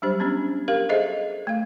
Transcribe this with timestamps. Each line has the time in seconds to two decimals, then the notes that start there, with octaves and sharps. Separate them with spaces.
0.02 F#3 G3 D4 G4 C5
0.20 B3 C#4 D4 G4
0.68 G4 A#4 F5
0.89 G#4 A4 C5 D#5 E5
1.47 A3 F5